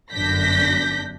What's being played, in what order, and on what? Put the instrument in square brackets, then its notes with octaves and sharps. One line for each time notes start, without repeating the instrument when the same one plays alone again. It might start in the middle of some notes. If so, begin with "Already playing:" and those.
[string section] G1 F#2 D4 G6 A#6 B6